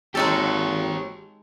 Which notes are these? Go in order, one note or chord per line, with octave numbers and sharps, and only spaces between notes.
G#1 G#3 D#4 G4 A4 C#5